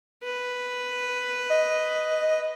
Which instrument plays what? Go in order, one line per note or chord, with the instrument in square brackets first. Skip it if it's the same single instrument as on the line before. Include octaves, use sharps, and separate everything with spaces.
[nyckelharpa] B4
[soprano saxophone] D#5